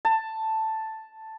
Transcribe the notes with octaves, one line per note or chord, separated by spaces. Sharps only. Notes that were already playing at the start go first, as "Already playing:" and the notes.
A5